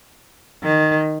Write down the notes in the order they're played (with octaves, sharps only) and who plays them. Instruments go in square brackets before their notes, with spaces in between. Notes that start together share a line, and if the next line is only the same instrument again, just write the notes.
[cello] D#3